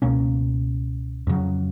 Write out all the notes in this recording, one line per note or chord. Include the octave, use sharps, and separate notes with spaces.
C#2 B2 A#3 C#4
F2 C#3 F#3